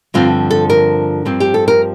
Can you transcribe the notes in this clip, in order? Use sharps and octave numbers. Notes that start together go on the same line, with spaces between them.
G2 D3 F3 C4 F4
A4
A#4
G2 F3 C4
G4
A4
A#4